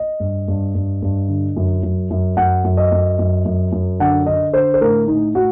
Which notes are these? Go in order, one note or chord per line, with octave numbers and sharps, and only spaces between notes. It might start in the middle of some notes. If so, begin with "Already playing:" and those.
Already playing: D#5
G2
G2
G2
G2
D3
F#2
F#2
F#2
F#2 F#5
F#2
D#5
F#2
F#2
F#2
F#2
D3 F#5
D3 D#5
D3 C5
C5
A2 A#4
A2 D#4
A2 F#4